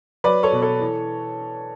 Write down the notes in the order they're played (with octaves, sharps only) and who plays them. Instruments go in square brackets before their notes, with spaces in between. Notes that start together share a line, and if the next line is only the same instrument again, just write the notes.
[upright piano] F#3 B4 D5
A4 C#5
B2
A4 C#5
E3